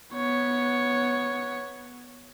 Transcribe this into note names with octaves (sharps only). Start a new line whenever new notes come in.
B3 C#5